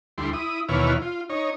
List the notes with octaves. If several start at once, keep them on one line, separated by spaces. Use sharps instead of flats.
D2 G3 E4 C6
E4 D#6
D#2 B2 E3 E4 C#5 F6
F4
D#4 C#5